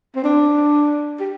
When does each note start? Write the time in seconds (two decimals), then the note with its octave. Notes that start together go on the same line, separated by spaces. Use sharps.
0.15 C4
0.24 D4
1.20 G4